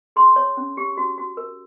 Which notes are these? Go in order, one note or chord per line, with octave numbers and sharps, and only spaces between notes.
G#4 C6
C#5
C#4
G4
F#4
F#4
A#4